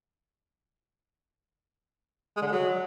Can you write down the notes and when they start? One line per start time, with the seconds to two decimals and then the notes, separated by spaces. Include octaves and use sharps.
2.37 G#3
2.42 D3
2.47 G#3
2.52 F#3